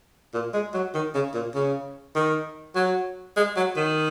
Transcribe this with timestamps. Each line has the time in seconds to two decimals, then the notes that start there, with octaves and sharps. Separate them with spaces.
0.34 A#2
0.53 G#3
0.74 F#3
0.94 D#3
1.14 C#3
1.34 A#2
1.54 C#3
2.15 D#3
2.75 F#3
3.36 G#3
3.56 F#3
3.76 D#3